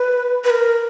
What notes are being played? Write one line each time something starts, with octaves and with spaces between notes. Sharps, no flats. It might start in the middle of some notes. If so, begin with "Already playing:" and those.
Already playing: B4
B4
A#4